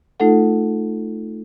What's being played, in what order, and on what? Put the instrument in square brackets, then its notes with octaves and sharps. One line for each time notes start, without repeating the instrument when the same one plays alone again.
[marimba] A3 D#4 F4 A4 F#5